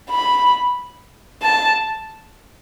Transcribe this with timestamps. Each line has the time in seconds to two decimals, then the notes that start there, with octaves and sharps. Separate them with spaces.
0.10 B5
1.42 A5